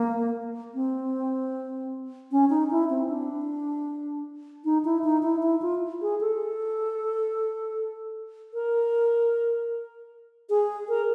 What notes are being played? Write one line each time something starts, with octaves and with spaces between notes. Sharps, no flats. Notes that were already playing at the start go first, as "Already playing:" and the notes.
Already playing: A#3
C4
C#4
D#4
E4
C4
D4
D#4
E4
D#4
E4
E4
F4
G#4
A4
A#4
G#4
A#4